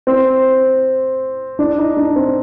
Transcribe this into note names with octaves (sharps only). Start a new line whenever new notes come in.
C4
D4
D#4
D4
C4